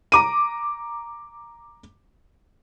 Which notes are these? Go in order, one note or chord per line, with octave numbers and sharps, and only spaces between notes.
A#5 D6 D#7